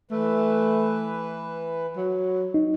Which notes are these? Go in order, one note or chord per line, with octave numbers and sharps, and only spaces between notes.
E3 A3 B4
F#3
D#4